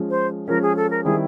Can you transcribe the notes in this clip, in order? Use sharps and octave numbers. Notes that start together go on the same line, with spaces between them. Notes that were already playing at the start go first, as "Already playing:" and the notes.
Already playing: F3 G#3 C#4
C5
F3 G#3 C#4 A#4
G#4
A4
A#4
D#3 G3 C4 E4 G#4